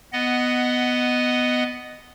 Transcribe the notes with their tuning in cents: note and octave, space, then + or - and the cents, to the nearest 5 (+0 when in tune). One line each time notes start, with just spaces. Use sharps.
B3 +10 D#5 -5 F#5 +0